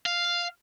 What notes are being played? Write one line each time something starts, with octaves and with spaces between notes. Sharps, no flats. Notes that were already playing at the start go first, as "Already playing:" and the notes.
F5